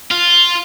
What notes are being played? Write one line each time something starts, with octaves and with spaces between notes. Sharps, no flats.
F4